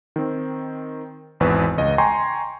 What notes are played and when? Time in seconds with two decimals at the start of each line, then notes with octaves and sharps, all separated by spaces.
0.16 D#3 C4
1.40 G#1 E2 B4 C#6
1.78 C#2 D#5
1.98 G5 G#5 A#5 C6 C#6